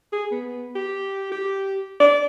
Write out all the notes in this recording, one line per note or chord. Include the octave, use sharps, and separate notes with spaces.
G#4
B3
G4
G4
D5